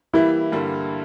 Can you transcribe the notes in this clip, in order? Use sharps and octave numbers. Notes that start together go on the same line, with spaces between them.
E3 G3 A#3 E4
G2 D3 G3 A#3